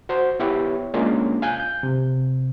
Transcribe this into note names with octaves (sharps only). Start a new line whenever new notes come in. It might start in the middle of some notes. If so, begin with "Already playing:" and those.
F#4 C5
B3 E4 G4 B4 C#5
G#3 A#3 C#4 D4 F4
F5 G#5 F#6 G6
G6
C3